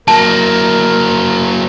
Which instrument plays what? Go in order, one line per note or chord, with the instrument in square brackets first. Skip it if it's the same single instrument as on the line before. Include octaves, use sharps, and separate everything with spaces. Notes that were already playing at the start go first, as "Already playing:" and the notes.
[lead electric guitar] F#3 A#3 [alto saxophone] A#4 [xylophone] A5